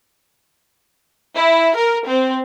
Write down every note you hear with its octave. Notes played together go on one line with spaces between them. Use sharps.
E4
A#4
C4